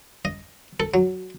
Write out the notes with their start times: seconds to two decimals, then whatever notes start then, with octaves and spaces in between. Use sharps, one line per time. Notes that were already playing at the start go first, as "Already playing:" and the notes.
0.25 D#5
0.80 A4
0.94 F#3